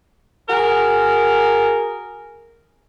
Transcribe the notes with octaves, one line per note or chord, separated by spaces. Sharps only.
F#4 G#4 A#4